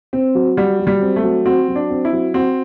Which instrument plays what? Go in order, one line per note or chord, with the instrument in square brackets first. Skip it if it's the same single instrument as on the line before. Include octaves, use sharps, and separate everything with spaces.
[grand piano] C4
F#3
[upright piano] G3 [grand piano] F#4
[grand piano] F#3
[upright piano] G3
[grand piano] C4
[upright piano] A3
[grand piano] F#3
[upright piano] C4 [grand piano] F#4
[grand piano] F#3
[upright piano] D4
[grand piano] C4
[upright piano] E4
[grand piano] F#3
[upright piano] C4 [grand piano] F#4